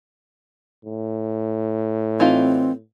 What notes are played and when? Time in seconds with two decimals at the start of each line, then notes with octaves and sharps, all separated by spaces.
0.85 A2
2.20 E3 C4 D#4 F4